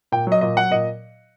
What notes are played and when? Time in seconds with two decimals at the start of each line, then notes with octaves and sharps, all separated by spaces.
0.12 A#2 G5
0.27 F#3 D#5
0.41 A#2 D#5
0.56 F#3 F#5
0.71 A#2 D#5